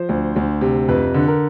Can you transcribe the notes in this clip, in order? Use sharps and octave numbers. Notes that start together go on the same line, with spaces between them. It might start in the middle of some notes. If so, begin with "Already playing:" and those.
Already playing: F3 C5
D2
D2
C3
F2 B4
D3
A#4